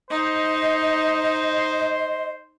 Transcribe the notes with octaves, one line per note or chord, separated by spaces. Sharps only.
D#4 C5 D#5